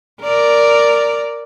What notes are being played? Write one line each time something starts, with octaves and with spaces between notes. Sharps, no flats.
A#4 D5